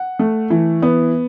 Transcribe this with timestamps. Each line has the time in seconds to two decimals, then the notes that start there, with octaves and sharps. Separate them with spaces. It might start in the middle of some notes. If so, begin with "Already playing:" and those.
Already playing: F#5
0.19 A3
0.50 E3
0.82 B3